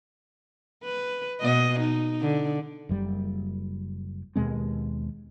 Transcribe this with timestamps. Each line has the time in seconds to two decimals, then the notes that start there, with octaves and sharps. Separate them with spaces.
0.84 B4
1.41 B2 D#5
1.80 D#4
2.21 D3
2.89 F#1 F#2 G3
4.35 D#2 B2 G#3 C4